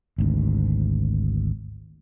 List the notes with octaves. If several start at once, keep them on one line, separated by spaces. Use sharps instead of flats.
G#1 D2